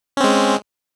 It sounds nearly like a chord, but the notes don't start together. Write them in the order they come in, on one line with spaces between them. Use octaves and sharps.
C#4 C4 G#3